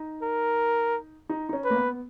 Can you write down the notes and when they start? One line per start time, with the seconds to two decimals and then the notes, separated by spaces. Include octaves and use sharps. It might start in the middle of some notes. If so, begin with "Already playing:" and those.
Already playing: D#4
0.22 A#4
1.29 D#4
1.49 D#4
1.53 C#4
1.65 B4
1.70 A#3
1.77 B3